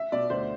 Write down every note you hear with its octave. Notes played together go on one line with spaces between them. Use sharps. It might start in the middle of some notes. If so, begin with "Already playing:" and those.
Already playing: E5
B2 D5
D2 C5